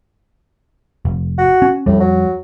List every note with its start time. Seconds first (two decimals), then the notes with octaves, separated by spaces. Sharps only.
1.05 F1
1.38 F#4
1.62 C#4
1.86 F2 A2 G3
2.00 F#3